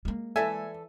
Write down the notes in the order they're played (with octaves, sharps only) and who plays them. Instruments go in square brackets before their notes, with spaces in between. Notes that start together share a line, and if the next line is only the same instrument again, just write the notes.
[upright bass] G#3 A#3
[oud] E3 D5 E5 [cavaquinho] A4 [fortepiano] G#5